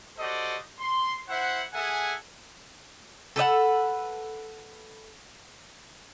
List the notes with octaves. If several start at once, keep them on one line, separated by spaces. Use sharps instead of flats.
F#4 G4 A4 C5 D5 D#5
C6
E4 C5 E5 F#5
G#4 A4 E5 F#5 G#5
A4 B4 D#5 F#5